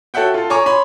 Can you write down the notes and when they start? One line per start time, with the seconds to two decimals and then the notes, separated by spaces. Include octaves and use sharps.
0.14 F#4 A4 C#5 E5 F#5 G5
0.34 F4 A4
0.50 C#5 G#5 A#5 C#6 D6
0.66 C#5 B5 C6